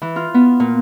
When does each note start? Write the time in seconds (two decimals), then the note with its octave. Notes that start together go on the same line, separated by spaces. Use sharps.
0.02 E3
0.16 F4
0.34 B3
0.60 A#2